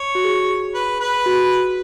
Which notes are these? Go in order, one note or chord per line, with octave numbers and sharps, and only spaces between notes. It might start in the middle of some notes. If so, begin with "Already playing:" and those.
Already playing: C#5
F#4
G#4
B4
B4
F#4